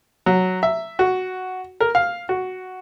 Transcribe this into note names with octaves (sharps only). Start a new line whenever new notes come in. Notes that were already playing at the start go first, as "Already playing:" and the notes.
F#3
E5
F#4
A#4
F5
F#4